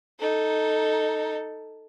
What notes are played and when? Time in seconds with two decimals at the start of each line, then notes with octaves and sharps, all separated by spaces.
0.19 D#4 A4